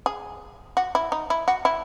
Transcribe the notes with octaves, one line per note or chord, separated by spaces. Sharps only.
G#4
F#4
E4
D#4
E4
F#4
E4